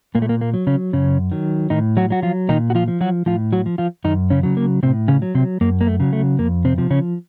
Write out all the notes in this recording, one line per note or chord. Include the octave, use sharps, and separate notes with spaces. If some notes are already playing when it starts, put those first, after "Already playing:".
A#2 A#3
A3
A#3
A#3
F#3
C#3 C#4
F#2 C#3 C#4
D#3 F#3
A2 D#3 D#4
F#3 F#4
F#3 F#4
F3 F4
A#2 D#3 D#4
F#4
F3 F4
F3
F#3 F#4
A2 F3 F4
F#3 F#4
F3
F3 F4
F#2 D#3 D#4
C#3 C#4
C#3 F#3
A#3
A2 C3 C4
C#3 C#4
F#3
C3 C4
F#2 A#3
A#3
A3
C#3 F#3
A3
F2 A#3
C3 C4
C3 F3
C#3 C#4